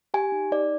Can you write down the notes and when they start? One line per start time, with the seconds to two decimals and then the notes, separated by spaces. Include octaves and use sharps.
0.14 G4 G#5
0.32 D#4
0.52 D#4 D5